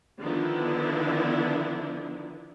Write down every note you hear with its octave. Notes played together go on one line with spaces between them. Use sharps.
D3 D#3 F3 B3 D4 E4